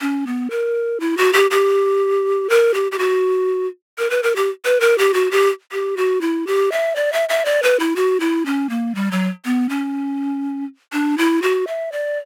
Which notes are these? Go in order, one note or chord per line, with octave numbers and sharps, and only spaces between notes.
C#4
B3
A#4
E4
F#4
G4
G4
A#4
G4
G4
F#4
A#4
B4
A#4
G4
B4
A#4
G4
F#4
G4
G4
F#4
E4
G4
E5
D5
E5
E5
D5
B4
E4
F#4
E4
C#4
A#3
G3
F#3
B3
C#4
D4
E4
F#4
E5
D5